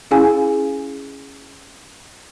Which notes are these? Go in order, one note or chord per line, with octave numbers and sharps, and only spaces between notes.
C#4 E4 G#4 F5 G#5